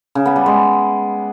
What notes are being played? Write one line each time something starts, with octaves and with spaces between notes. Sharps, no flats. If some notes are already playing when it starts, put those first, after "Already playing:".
C#3
B3
G3
G#3